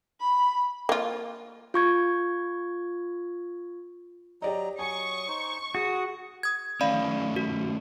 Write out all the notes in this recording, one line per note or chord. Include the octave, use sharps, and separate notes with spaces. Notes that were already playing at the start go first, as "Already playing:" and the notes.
B5
A#3 F4
F4 C#6 G#6
F#3 G4 D5 D#5 A#5
F#3 G#5 C#6 D#6
D#4 C5
F#4 G#4 D#6
D#6 G#6
D#3 A3 C#4 D5 F5 B5
F#4